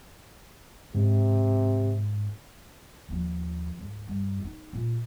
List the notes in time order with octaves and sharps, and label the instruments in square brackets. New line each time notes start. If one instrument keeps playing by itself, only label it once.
[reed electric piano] G#2 [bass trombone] C3
[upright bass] D#2 F3
C#2 G#2
G2
D#4
A#2 A3